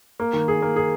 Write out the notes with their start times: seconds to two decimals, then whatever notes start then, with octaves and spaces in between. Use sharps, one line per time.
0.20 A#3
0.33 D#3
0.48 G#4
0.62 A#3
0.76 G#4